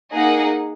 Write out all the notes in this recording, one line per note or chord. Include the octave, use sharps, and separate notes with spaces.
A#3 D#4 G#4 D#5 F#5